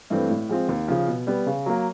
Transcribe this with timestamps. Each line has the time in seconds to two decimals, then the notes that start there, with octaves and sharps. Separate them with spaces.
0.10 G2 E3 A3 C4
0.30 A2
0.49 F3 G#3 C4 F4
0.69 D#2
0.88 C#3 F3
1.08 B2
1.27 G3 B3
1.46 C#3
1.66 F#3 A#3